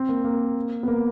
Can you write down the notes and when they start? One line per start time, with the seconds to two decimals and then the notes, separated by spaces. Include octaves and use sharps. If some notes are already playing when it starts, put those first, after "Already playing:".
Already playing: C4
0.09 A#3
0.24 A#3
0.83 B3
0.88 A#3